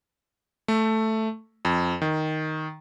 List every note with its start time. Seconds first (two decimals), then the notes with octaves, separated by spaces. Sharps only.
0.68 A3
1.65 F2
2.02 D#3